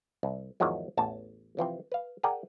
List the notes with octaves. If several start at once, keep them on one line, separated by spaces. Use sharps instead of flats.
C2
E2 G#2 D#3 F3 F#3 G#3
A1 E2 A5
C3 E3 F3 C4
B4 F5
G#4 A#4 D5 F#5 G5